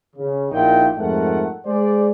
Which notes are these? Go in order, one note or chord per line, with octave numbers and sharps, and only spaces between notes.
C#3
A#1 A#2 D#4 E4 G5
F2 G#2 A3 A#4 F#5
G#3 G#4 C5 D5